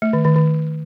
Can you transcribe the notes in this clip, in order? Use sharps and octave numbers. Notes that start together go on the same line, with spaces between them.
A3
D#3
D#3
D#3